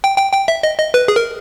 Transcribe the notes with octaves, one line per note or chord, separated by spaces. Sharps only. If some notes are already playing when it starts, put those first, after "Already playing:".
G5
G5
G5
E5
D#5
D#5
B4
G#4
A#4